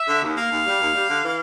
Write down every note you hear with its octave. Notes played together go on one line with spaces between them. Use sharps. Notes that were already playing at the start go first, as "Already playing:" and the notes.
Already playing: E5
D3
D#2
A#3 F5
D#2
G3
D#2
G3
D3
E3